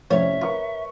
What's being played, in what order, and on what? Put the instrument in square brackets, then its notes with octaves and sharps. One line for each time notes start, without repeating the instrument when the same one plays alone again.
[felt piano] F1 A2 C#4 [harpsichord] F3 [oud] C#5 [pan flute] E5
[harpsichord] F4 [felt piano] A#4 B4 C#6